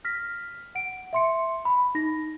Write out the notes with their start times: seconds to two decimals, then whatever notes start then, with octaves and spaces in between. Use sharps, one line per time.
0.05 F6 A#6 B6
0.75 F#5 D7
1.13 E5 C6 C#7
1.65 B5
1.95 D#4 A#6